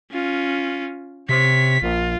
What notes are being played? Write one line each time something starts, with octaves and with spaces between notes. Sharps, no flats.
C#4 F4
C3 C#5 B6
A#1 F4